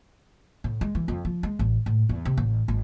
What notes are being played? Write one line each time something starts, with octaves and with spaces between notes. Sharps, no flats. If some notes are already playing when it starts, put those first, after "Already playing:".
A2
G#3
E3
F2
F3
G#3
A1
A2
E2
C3
A1
G#1